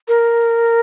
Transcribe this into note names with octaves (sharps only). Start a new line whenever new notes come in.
A#4